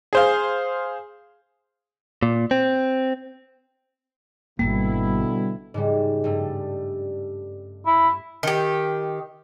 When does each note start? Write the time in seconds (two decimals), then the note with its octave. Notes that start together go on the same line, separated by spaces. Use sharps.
0.13 G#4 C5 F5
2.23 A#2
2.51 C4
4.59 G#1 F#2 B2 D3 G3 A#3 E4
5.74 G#2 C#3 G3
6.24 G2 G3 A3
7.86 E4
8.43 D#3 G4